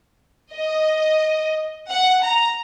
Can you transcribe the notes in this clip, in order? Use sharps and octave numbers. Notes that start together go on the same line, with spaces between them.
D#5
F#5
A#5